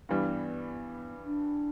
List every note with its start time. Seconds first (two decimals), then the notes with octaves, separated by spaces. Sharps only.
0.09 G2 E3 G3 B3
1.25 D4